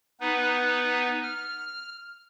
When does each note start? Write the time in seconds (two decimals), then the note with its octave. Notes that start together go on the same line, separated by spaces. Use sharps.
0.20 B3 D#4 B4
1.23 F6